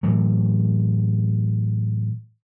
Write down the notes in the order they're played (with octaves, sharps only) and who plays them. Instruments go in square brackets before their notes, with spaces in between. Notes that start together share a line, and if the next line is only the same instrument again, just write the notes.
[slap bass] A2 E3 F#3